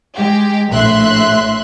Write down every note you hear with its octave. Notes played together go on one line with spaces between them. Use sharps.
G#3 G4
A#1 A2 E5 C6 F#6